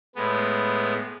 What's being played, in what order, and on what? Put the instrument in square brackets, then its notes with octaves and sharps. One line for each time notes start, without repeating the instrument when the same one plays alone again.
[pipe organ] A2 G#3 B3